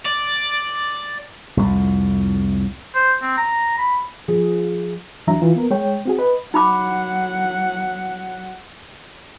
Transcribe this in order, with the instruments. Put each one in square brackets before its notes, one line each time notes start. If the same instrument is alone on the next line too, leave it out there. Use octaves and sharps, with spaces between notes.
[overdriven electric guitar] D5
[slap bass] C2 F2 A2
[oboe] C5
C4
A#5
B5
[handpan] F3 G#4
[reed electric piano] D#2 E3 F#3 D4 E5 A#5
E3 F4
B3 A#4
G#3 C#5 G5
C4 F#4 G#4
B4 D#5
[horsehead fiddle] F#3 F#5 [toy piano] D#4 B5 D6